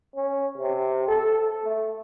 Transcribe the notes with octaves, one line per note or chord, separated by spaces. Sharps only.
C#4
C3
A4
A3